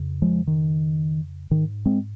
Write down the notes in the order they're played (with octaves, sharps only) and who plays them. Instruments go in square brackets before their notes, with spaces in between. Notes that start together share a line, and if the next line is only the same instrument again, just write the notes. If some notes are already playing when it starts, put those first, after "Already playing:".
Already playing: [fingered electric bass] F2 C#3
F3 G#3
D#3
G#2 D#3
G#3 C4